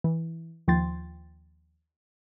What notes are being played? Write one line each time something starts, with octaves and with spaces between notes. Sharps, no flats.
E3
D#2 F3 G5 C6 A6